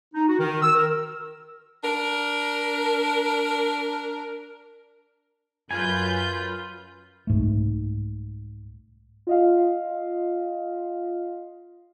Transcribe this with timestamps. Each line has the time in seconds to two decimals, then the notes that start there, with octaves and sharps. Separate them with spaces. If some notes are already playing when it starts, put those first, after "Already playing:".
0.15 D#4
0.28 F#4
0.40 D#3
0.62 E6
0.75 A#4
1.84 D4 A#4
5.71 F#2 F4 B4 G#5 G6
7.27 C2 G#2 A3
9.27 F4 D#5 F5